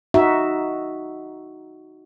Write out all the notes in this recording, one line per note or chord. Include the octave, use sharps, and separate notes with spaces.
D#4 F#4 E5